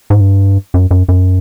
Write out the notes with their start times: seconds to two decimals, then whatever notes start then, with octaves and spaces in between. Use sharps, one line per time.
0.10 G#2
0.20 G2
0.74 F#2
0.91 F#2
1.08 F#2